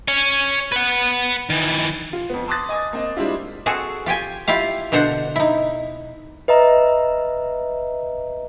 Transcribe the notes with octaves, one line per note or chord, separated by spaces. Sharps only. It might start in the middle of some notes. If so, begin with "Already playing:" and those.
C#5 G#5
B4 F#5
D#3 E3
F4
F2 B3
A5 C6 D6 D#6 F#6 A6
D#5 G#5 D6 D#6
A#3 C4 D#5
G3 G#3 C4 D4 E4 F4
C4 F#4 G#4 A4
F4 G4 G5 G#5
E4 F4 G4 F5
B2 D3 D4 C5 F#5
D#4 E4
B4 D#5 E5 A#5